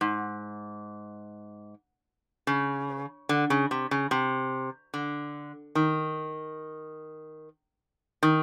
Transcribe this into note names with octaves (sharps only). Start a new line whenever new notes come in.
G#2
C#3
D3
C#3
C3
C#3
C3
D3
D#3
D#3